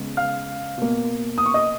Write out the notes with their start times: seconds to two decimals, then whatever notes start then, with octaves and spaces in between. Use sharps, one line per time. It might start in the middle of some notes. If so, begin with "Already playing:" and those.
Already playing: C#3 G#3 B3
0.17 F5 F6
0.78 B2 A#3
1.38 D#6
1.46 C#6
1.54 D#5 D#6